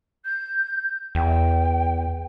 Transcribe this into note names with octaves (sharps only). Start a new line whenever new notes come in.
G6
E2 G5